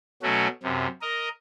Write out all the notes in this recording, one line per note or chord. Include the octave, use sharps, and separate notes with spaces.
B2 F#3 A3 C#4 F#4
F#2 C3
A#4 D#5